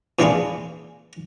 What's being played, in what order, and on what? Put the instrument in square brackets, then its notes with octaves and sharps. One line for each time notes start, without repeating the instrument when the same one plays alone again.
[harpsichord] A#2 E3 D4 E4 F4 G#4